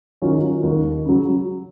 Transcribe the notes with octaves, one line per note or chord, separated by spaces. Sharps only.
D#3 F#3 C#4 F4
D#2
C#3 F#3